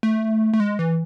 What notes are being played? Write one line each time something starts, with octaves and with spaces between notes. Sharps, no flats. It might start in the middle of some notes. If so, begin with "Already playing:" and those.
A3
A3
G#3
E3